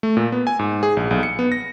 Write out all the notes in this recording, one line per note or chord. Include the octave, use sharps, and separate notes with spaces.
A3
A#2
B3
G#5
G#2
G#4
A#1
B1
C#7
B3
A#6